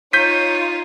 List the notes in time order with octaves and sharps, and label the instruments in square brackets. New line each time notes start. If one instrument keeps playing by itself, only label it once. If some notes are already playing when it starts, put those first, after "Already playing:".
[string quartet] D#4 F4 [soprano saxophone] C#5 [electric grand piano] G6 B6 [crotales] D#7